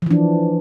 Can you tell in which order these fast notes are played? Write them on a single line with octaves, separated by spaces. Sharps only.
F3 E3 D4